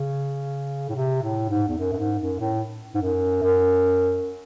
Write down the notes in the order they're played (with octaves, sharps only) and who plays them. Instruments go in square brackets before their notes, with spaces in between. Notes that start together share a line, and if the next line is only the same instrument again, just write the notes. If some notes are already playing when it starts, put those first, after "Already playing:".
Already playing: [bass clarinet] C#3
A2
C3
A2
G#2
E2
F#2
F#2
G#2
F#2
A2
G#2
F#2
F#2